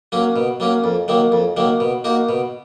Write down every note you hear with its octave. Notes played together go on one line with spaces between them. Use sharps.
F#3 A#3 C#4
B2
F#3 A#3 C#4
F2
D#3 F#3 A#3
F2
D#3 F#3 A#3
B2
A#3 D#4 F#4
B2